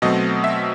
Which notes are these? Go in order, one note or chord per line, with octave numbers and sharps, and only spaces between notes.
B2 F#3 A3 C4 D#5
E5